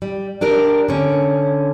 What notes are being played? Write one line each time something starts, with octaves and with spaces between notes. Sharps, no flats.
G3
D4 G4 A#4
D3 C#4